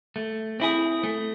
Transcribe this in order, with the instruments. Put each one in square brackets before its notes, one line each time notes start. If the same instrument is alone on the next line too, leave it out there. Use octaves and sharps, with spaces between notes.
[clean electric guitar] A3
C4 E4 G#4
A3